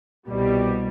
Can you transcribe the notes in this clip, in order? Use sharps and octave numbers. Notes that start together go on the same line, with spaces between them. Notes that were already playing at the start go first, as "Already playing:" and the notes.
C2 B2 G3